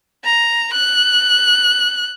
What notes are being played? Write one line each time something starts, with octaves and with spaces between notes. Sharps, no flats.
A#5
F#6